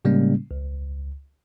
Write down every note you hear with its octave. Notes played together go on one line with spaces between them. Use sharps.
A2 C#3 G3 G#3 A#3 C#4
C#2